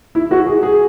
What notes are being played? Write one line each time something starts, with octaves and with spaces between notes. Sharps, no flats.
E4
F#4
G#4
G#4